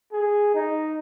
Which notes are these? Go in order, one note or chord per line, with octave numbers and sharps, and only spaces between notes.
G#4
D#4